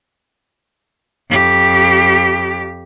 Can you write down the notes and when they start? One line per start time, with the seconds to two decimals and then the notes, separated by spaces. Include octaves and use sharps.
1.30 F2 G4